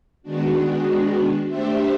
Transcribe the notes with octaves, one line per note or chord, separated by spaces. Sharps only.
D#3 G#3 B3 D4 F#4
A3 D4 G4 C5 E5